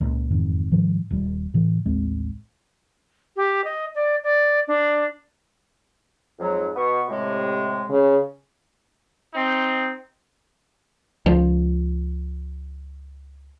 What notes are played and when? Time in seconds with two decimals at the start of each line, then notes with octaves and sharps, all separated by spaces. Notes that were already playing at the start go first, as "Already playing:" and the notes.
0.01 C#2 A#2
0.30 E1 F2 G#2 D#3
0.72 G#2 D#3 F3 G3
1.10 D#1 G3
1.54 A2 C#3 E3
1.86 A1 D#2 G#3 C4
3.36 G4
3.64 D#5
3.95 D5
4.24 D5
4.68 D4
6.40 F2 G#2 F#3
6.76 B2 B3 C#6
7.09 A2 C3 G#3
7.90 C#3
9.33 C4 D#4
11.26 C#2 F3